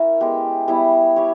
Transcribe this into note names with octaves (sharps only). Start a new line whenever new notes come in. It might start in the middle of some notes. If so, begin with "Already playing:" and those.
Already playing: C#4 E4 A#4 E5
G#3 B3 G4
G3 B3 E4
G4 C#5